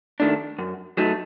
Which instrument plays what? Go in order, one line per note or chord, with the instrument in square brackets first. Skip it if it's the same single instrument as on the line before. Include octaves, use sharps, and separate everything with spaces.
[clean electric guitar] D#3 A3 D4
F#2
F#3 A3 D#4